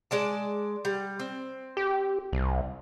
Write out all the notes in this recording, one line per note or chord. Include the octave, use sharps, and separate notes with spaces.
G#3 D5 A5
G3
C4
G4
C2